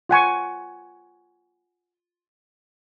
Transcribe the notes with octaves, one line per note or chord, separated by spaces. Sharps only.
F4 F#5 G#5 C#6